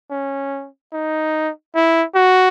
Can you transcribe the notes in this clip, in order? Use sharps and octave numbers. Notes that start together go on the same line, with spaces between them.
C#4
D#4
E4
F#4